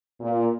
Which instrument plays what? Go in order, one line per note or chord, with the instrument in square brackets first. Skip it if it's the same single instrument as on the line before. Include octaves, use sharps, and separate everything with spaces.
[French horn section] A#2